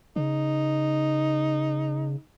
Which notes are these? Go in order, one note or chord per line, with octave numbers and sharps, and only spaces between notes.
C#3 D#4